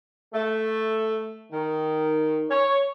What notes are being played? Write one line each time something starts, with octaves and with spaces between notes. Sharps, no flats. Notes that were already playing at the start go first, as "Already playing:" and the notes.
A3
D#3
C#5